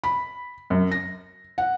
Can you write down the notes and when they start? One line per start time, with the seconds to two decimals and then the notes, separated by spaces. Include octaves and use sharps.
0.04 B5
0.70 F#2
0.92 A#6
1.58 F#5